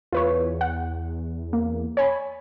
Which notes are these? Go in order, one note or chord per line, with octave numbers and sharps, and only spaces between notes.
E2 F4 B4 C#5
F#5
A#3
C#5 G#5 B5